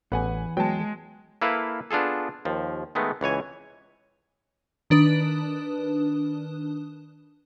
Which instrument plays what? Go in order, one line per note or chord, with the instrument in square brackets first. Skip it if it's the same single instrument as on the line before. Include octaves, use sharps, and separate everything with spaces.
[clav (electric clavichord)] A1 [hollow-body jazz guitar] E2 [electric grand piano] B4 F#5 G#5
[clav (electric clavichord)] F#3 B3 [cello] G#3 [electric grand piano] G5 A5
[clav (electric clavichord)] A#3 E4 A4 B4 F5
B3 D4 F4 G#4 A4
D#2 F3
D#3 G#3 A3 B3
C#2 E3 C#5 G#5
[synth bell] D#3 D4 B4 D#6